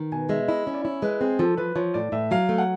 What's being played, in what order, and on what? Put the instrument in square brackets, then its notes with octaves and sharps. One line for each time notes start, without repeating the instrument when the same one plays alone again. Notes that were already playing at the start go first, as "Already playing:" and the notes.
Already playing: [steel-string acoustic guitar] D#3
[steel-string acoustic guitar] B2 [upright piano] G#5
[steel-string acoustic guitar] G#3 [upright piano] E5
[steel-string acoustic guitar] E4 [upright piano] D#5
[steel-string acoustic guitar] C#4
[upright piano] D5
[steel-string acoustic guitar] E4 [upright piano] C#5
[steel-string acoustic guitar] G#3 [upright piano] B4
[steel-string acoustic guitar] C4 [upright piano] G#4
[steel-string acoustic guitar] F3 [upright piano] A4
[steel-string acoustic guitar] F3 [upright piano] B4
[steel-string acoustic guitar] F3 [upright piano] C#5
[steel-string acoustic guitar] A2 [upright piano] D5
[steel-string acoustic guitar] A2 [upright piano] E5
[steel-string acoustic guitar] F#3 [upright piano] F5
[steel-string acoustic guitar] A3
[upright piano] F#5